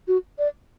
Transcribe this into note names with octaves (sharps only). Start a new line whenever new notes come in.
F#4
D5